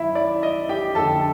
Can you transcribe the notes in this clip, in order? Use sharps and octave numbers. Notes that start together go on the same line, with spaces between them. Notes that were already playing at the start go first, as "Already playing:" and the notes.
Already playing: F#2 D#3 E4 E5
D5
D#5
G4 G5
F2 D3 A4 A5